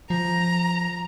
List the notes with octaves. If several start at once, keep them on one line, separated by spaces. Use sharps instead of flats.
F3 A#5